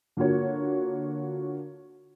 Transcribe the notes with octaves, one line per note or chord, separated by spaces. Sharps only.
D3 A#3 F4 F#4 C#5